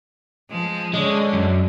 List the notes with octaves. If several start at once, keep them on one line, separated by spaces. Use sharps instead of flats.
F3 G#3
D3 G#3 C#4
F#2